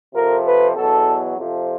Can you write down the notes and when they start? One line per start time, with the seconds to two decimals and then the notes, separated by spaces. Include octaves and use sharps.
0.15 F2 C3 F3 A#4
0.46 B4
0.77 E2 B2 F#3 A4
1.38 F2 C3 F3